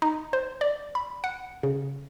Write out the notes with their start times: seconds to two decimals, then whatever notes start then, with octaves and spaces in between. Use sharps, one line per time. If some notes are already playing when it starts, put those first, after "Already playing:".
0.02 D#4
0.33 C5
0.61 D5
0.95 B5
1.24 F#5
1.63 C#3